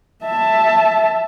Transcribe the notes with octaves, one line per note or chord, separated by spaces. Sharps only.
E5 A5